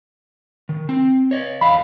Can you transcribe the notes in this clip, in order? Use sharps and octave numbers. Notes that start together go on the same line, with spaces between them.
D#3
C4
C#5 D#5
E2 F5 B5